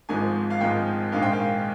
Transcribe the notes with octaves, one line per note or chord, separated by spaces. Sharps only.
G#1 G#2 F3 G#3 G#5
F5
G#1 G#2 F3 G#3 G5
A#1 G#2 D#3 G#3 F5
G5
F5